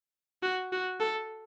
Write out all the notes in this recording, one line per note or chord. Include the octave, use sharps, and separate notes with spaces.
F#4
F#4
A4